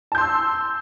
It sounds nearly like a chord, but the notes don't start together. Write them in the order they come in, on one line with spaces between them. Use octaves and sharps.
A5 G6 C6 E6